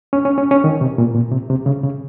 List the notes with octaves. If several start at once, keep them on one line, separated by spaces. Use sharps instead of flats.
C#4
C#4
C#4
C#4
D#3
C3
A#2
A#2
C3
C3
C#3
C#3